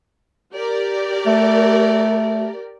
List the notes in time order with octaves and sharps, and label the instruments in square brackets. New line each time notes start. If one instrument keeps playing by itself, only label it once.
[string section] G4 A#4 D5
[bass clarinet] A3